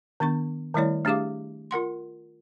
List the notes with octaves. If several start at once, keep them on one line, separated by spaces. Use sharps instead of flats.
D#3 B3 D4 C#6
D#3 G3 A3 E4 C#5 D5
A3 D4 G4 G#4 F5 D6
F4 A#4 F#5 C6